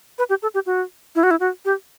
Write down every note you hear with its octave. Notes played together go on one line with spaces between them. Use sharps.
B4
G4
A4
G4
F#4
E4
F#4
E4
F#4
G4